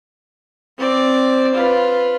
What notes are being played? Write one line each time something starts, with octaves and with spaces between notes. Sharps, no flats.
C4 D5
F4 B4